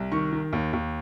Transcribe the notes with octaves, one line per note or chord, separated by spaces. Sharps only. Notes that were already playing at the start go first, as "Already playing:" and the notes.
Already playing: C2
D#3 C#6
D#3
D#2
D#2